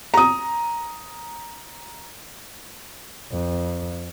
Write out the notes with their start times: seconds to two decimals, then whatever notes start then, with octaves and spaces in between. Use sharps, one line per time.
0.14 A#5 D#6
3.32 F2